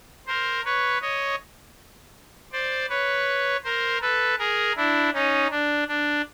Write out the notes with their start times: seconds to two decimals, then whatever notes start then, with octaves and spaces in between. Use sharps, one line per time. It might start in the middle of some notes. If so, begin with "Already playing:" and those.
0.27 A#4 C5
0.65 B4 C#5
1.02 C#5 D#5
2.52 C5 D5
2.89 B4 C#5
3.64 A#4 C5
4.02 A4 B4
4.38 G#4 A#4
4.76 D4 E4
5.13 C#4 D#4
5.51 D4
5.88 D4